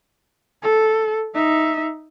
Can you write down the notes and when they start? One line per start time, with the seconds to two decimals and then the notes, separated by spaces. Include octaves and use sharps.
0.63 A4
1.34 D#4 E5